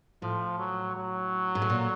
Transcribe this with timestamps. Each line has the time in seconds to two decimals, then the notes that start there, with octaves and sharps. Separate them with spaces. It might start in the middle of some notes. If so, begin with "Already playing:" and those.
0.22 A2 F3
0.59 F#3
0.96 F#3
1.55 G#2
1.62 A2
1.70 A#2